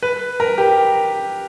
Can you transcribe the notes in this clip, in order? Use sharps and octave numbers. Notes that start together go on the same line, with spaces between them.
B4
A#4
G4